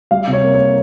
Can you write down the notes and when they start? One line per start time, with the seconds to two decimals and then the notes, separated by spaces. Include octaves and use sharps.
0.11 G3 F5
0.27 C3
0.33 C#5
0.44 A#3
0.55 C#5
0.60 A#3